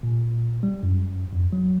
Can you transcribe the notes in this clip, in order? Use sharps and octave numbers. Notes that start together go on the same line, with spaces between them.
A#2
G3
F#2
F2
F#3